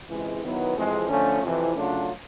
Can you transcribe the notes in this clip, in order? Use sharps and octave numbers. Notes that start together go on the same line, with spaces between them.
C#2 C3 E3 G#3
D#3 F#3 B3 E4
F2 C3 E3 G#3
D3 F3 A3 C#4
F2 C3 E3
C#3 F#3 A3 D4 F4